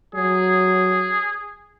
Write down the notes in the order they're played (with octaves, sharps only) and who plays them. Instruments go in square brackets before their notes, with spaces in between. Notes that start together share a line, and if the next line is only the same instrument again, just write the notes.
[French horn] F#3 [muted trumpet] G#4